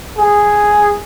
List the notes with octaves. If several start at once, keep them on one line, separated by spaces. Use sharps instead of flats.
G#4